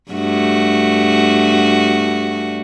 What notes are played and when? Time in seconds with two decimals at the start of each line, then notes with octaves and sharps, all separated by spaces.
0.12 G2 A3 F#4